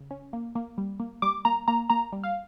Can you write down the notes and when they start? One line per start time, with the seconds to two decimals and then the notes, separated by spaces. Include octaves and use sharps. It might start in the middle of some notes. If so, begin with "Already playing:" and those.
Already playing: C#3
0.11 C#4
0.33 A#3
0.55 A#3
0.78 G3
1.00 A#3
1.22 G3 D6
1.45 A#3 A#5
1.68 A#3 A#5
1.90 A#3 A#5
2.12 G3
2.24 F5